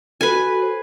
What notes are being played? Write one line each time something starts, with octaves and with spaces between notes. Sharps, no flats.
F#4 A4 B4 G#5
C5